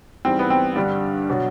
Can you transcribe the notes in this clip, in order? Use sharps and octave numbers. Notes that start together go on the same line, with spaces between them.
G#2 E3 G3 C4
B3
C4
G2 D3 G3 D4
B2 F#3